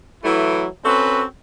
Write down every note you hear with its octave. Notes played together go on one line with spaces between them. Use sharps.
E3 F#3 A3 E4
C4 C#4 F#4 A4 B4